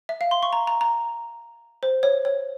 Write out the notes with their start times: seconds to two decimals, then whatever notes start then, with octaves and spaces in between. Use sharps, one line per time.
0.09 E5
0.21 F5
0.31 C6
0.43 C#6
0.53 A#5
0.67 A#5
0.81 A#5
1.83 C5
2.03 C#5
2.25 C#5